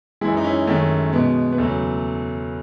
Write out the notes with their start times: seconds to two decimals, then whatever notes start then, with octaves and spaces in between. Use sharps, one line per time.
0.21 G#3 E4 G#4
0.24 F#2 E3
0.37 D#4
0.44 C#4 E4
0.67 F#2 D#3 G#3 A3 C#4
1.13 B2 G#3 B3
1.52 B3
1.58 E2 C#3 F#3 A3